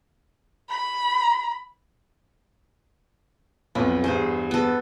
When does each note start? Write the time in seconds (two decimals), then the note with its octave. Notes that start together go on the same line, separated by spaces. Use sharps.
0.69 B5
3.75 B1 F2 B3
4.04 E2 G2 G#4 C5
4.51 B3 A4